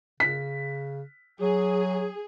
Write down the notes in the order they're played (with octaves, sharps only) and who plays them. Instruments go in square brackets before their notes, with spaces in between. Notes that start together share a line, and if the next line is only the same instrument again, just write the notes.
[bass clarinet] C#3 [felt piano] B6
[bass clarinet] F#3 [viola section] G#4